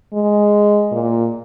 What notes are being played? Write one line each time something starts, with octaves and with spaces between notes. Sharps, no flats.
G#3
A#2